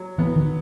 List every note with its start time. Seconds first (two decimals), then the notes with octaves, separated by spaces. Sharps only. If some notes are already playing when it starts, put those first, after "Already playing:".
Already playing: F#3
0.18 E3 B3
0.36 D#3